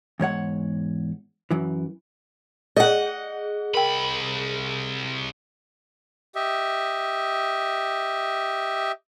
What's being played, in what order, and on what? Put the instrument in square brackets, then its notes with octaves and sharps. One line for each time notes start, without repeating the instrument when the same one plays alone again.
[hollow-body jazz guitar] E2 G#2 C#5 F#5
F#2 E3
[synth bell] G#4 [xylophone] D5 [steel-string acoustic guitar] D#5 F#5
[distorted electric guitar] C2 B5 [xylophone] A#4 G5
[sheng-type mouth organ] G4 D#5 E5